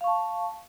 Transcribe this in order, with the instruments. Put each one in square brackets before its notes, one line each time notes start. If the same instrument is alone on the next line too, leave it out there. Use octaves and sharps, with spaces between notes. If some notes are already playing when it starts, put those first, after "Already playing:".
[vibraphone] F5
C#6
A5